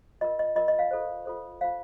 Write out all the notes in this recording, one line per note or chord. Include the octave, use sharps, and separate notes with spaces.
F4 A#4 D#5
D#5
F4 A#4 D#5
D#5
F5
F4 A4 C5
F4 A4 C5
F4 C5 F5